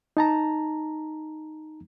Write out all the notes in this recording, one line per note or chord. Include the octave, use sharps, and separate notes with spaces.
D#4 A5 A#5